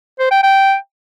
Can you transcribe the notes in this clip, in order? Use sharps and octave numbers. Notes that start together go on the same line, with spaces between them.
C5
G5
G5